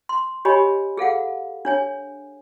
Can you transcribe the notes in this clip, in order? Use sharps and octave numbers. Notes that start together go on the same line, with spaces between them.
C6
G4 C#5 D#5 G#5 B5
G#4 A4 F5 F#5
D4 C#5 G#5